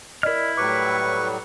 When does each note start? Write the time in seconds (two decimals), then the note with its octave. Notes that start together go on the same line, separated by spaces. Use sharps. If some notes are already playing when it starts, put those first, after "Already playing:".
0.23 E4 A#4 D5 D#5 F6
0.57 A2 F#3 G3 B4 C#6 D6